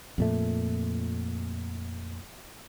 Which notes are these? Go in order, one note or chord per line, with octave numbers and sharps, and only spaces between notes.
F2 A#2 A3